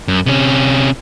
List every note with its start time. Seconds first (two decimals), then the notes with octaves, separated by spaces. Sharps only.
0.08 F#2
0.26 C3 C#4